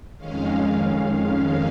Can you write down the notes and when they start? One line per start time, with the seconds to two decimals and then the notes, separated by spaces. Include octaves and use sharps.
0.18 F2 D#3 G#3 C#4 F5
1.11 F5